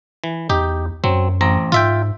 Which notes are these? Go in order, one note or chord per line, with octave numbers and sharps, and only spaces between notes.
E3
E2 D#4 G4
F#2 F#3 C4
A1 C4 A#5
G#2 F4 E5 G5